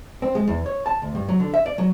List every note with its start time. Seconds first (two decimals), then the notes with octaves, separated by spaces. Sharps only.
0.22 C4
0.35 G#3
0.48 E2
0.66 C#5
0.86 A5
1.02 D2
1.15 G2
1.29 F#3
1.40 D3
1.54 E5
1.66 D5
1.78 F#3